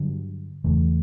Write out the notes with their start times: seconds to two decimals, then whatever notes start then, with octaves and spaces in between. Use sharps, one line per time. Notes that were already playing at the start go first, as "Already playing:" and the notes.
Already playing: G2 D3 F#3
0.64 E2 C#3 E3 A3